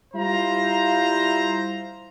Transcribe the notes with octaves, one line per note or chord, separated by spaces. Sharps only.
G3 E4 F4 C5 A#5